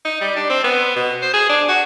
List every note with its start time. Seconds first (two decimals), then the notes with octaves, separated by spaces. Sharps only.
0.05 D#4
0.21 G3
0.36 D4
0.49 C4
0.64 B3
0.96 B2
1.22 C5
1.33 G#4
1.49 D4
1.68 F#4